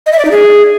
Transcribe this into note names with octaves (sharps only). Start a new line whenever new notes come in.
D#5
E5
D5
D#4
G#4